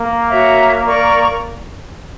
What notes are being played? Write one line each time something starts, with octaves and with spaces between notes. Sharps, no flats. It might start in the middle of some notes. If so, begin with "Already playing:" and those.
Already playing: A#3
F#4 C#5 E5 A#5
A#4 D5 A#5 C#6